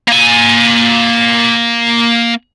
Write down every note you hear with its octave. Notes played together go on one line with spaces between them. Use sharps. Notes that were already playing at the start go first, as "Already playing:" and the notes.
A#3 G#5